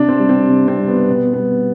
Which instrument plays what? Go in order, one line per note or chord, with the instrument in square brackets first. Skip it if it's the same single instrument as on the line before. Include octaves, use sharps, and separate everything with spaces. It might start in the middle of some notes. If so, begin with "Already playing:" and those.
Already playing: [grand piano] C3 D4
C4
G3
C4
C3
C4
G3
B3
B2 B3
G3 B3